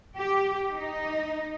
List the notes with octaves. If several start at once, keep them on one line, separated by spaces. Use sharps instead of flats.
G4
D#4